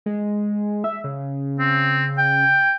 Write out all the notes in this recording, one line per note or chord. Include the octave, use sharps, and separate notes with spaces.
G#3
E5
C#3
C4
G5